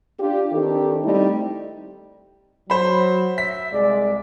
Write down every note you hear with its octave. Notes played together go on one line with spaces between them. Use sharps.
D4 F4 G4
D#3 C4 D4 D#4 G4 A4
G3 A3 C4 D#4 E4
F#3 C5 B5
E5 B6
C2 G#3 D5